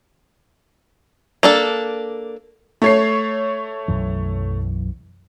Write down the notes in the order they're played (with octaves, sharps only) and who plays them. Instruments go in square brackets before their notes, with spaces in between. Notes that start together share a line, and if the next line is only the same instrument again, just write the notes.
[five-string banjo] A#3 D4 A4
[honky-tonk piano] A3 C#5 C7
[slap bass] B1 F#2 E3